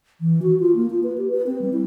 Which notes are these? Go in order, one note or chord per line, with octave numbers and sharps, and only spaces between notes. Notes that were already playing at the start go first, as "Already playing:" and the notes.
E3
F#4
F4
A#3
F4
B4
G4
B4
C4
G3
E4